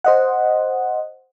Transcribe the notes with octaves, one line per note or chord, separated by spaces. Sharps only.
C5 D#5 F#5